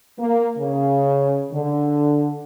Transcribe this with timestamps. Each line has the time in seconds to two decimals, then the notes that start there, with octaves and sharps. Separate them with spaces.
0.19 A#3
0.59 C#3
1.52 D3